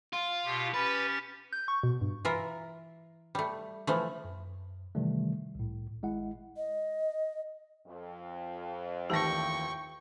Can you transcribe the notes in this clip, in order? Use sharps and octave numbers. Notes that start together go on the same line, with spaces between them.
F4
B2 G4
C#4 G4 B4 A6
G6
C#6
B2
G2
E3 F4 A#4 E5
G3 A3
E3 F3 A3
F#2
C3 D#3 E3 G3 A3
C2 A2
G#1 G#3 E4 F#5
D#5
F2
A1 D#2 G4 G5 A5 C#6 A#6